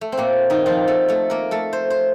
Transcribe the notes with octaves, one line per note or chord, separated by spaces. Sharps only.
A3
C4
A#2 A#3
D#3 D#4
F3 F4
A3 A4
A3 A4
A#3 A#4
A3 A4
C5
C5